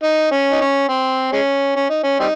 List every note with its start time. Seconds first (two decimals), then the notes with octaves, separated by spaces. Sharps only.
0.03 D#4
0.31 C#4
0.51 D#4
0.61 C#4
0.89 C4
1.33 G#3 C#4
1.76 C#4
1.89 D#4
2.04 C#4
2.20 G3 C4 D#4